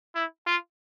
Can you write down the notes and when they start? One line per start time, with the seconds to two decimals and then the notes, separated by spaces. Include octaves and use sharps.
0.15 E4
0.46 F4